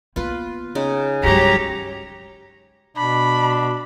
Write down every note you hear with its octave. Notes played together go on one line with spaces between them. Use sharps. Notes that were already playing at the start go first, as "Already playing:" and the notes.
A#3 B3 F4 B4
C#3 D#4 G#5
G2 F#3 G#3 G4 C#5 A#5
B2 D4 B5